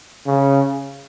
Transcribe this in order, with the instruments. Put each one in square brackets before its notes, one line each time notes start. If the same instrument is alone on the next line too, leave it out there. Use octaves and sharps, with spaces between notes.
[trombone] C#3